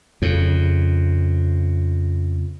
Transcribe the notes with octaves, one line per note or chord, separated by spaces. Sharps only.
F2 C#3